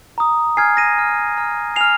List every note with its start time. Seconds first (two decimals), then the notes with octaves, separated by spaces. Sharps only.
0.18 A#5 D#6
0.57 G#5 F6 G#6 C7
0.77 A#6 D#7
0.98 G#5 F6
1.37 A#5 F6
1.76 G#5 F6 C7 F7